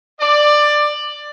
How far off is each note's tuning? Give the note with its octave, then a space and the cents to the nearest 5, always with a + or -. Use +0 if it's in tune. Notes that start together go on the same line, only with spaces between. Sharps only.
D5 +15